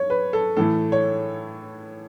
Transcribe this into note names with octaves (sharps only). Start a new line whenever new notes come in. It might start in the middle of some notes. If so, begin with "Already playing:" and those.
Already playing: C#5
B4
A4
A2 E3 A3 A4
C#5